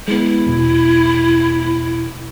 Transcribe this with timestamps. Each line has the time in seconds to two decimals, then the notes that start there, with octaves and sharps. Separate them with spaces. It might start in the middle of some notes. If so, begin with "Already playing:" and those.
0.08 G#3 B3 E4
0.46 E2 B2